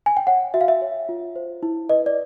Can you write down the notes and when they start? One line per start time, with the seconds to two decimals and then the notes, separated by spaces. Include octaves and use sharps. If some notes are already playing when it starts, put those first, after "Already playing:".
0.06 G#5
0.17 G5
0.27 C#5 F#5
0.54 F#4 E5
0.61 F5
0.68 E5
0.82 C#5
1.09 F4
1.36 C5
1.63 E4
1.89 B4 D#5
2.06 D5